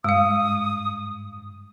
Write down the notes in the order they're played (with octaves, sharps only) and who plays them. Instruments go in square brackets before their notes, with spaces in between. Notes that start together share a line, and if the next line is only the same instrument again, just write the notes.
[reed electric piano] G2 [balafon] G#3 F5 [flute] D#6